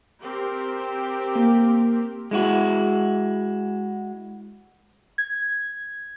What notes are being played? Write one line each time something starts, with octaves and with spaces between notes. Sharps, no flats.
C4 G4 A#4
A#3
G#3 E4 F#4
G#6